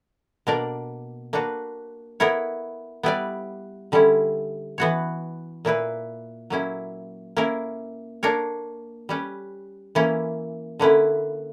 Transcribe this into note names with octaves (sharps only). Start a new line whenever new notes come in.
B2 A#3 D4 A#4 D5
A#3 D4 F#4 B4
B3 E4 A#4 C#5
G3 B3 E4 B4 D5
D3 G3 C#4 E4
E3 B3 F#4 C#5
A#2 A#3 E4 B4
F#3 A#3 C#4 E4
A#3 C#4 E4 A#4
A#3 D4 A#4 C#5
G3 C#4 G4 B4
E3 A#3 C#4 E4
D3 A#3 C#4 E4 B4